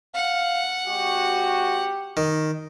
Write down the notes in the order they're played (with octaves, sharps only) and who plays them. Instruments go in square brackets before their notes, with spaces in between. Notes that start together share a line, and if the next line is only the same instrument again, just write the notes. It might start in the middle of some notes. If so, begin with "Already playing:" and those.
[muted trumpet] F5 [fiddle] F#5
[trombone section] C3 G#3 F#4 [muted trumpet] G4
[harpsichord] D#3